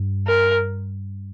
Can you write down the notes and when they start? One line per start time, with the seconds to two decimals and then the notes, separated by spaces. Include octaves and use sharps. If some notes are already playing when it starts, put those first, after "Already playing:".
Already playing: G2
0.27 A#4